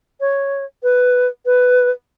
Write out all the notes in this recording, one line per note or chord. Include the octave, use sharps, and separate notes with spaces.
C#5
B4
B4